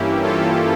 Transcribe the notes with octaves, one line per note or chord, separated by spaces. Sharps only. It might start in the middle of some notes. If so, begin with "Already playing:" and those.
Already playing: G2 E3 A#3 C#4 E4 G4
F4 A4